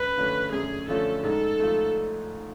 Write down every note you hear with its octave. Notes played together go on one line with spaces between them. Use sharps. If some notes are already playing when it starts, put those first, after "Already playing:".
Already playing: F#2 B4
D3 F3 A3 C#4
F#2 G#4
D3 F3 A3 C#4 A4
G#2 A4
F3 A3